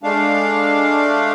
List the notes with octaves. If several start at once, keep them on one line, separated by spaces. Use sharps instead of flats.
G#3 A3 D4 F5